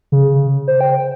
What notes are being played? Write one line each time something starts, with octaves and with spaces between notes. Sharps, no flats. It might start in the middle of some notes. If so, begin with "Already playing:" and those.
C#3
C5
G5